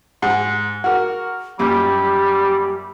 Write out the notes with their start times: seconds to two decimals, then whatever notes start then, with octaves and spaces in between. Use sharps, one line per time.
0.22 G#2 F#5
0.84 F#4 G#4 A#4 F#5
1.59 F#2 A#2 G3 G4